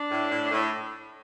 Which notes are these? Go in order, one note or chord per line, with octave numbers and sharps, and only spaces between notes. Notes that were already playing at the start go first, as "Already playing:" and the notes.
Already playing: D4
A2
A2
A2